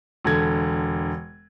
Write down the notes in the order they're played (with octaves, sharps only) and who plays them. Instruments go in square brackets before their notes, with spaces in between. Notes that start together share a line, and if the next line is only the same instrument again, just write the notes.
[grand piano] E1 D3 G#6